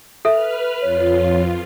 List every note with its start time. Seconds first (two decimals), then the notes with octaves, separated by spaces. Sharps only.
0.25 A4 B4 E5 F6
0.81 F2 F4 C#5